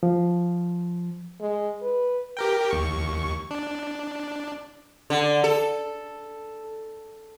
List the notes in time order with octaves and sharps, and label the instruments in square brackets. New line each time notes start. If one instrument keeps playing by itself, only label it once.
[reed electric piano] F3
[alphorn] G#3
B4
[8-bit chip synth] G4 A#4 G5
D#2 C#6
D4
[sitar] D3
A4